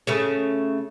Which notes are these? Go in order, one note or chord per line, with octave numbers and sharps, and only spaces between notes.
C#3 A3 C#4